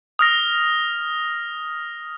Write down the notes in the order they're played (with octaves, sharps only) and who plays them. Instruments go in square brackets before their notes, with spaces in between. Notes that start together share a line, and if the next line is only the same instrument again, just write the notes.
[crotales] D#6 F6 A#6